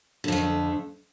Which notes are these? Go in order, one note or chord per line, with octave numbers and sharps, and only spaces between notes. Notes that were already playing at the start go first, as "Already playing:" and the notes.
F2 D3 A3